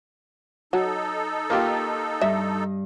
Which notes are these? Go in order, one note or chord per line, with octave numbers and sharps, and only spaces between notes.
F#3 D#4 A4
A#3 F4 G4
G2 D#5 E5